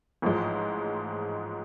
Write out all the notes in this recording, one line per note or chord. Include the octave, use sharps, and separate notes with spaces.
A1 G#2 F3 G#3